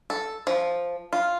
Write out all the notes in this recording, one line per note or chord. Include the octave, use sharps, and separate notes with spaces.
A4
F3
F4